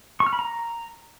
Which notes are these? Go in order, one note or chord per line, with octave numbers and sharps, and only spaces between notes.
C#6
F6
B5
A#5